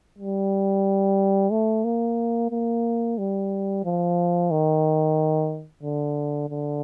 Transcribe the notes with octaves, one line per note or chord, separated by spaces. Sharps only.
G3
A3
A#3
A#3
G3
F3
D#3
D3
D3